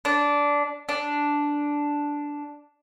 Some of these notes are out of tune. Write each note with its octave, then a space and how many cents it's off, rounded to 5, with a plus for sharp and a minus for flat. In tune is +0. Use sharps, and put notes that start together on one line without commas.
D4 -15
D4 -5